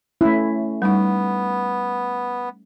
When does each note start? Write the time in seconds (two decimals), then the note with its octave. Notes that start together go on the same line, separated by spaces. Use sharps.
0.21 A3 C#4 E4
0.82 G3 B3 D#4